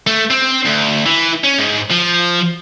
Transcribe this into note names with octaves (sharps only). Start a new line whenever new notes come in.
A3
C4
D2
E3
C#4
G#2
F3